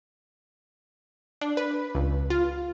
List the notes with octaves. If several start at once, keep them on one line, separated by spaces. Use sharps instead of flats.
D4
B4
C#2
F4